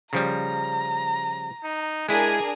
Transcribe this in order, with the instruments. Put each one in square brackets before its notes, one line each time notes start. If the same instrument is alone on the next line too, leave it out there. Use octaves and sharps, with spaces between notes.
[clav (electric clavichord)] C#3 F3 G3 [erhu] A#5
[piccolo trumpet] D#4
[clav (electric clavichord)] G#3 E4 [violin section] D4 G#4 A#4 [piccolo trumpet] G#5